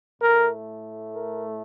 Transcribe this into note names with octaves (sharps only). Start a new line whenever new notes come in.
A2 A3 A#4
A#4